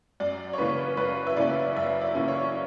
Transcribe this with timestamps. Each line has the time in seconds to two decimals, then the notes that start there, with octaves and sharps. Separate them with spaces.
0.20 F#2 D5
0.53 C#5
0.58 C#3 E3 A#3 C#4 B4
0.97 F#2 B4
1.27 E5
1.37 C#3 E3 A#3 C#4 D5
1.76 F#2 E5
2.01 D5
2.15 C#3 E3 A#3 C#4
2.28 C#5